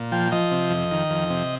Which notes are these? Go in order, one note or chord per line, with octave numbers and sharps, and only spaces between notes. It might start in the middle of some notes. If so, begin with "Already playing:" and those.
Already playing: A#2
F3 G5
F3 D#5
C3
F2
D#3
F2
C3